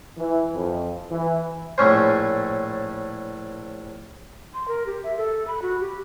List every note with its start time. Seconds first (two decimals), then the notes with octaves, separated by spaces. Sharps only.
0.18 E3
0.55 F2
1.12 E3
1.78 A#1 A2 A3 C#4 C5
4.54 C6
4.68 A#4
4.86 G4
5.04 E5
5.17 A4
5.48 B5
5.62 F#4
5.80 G4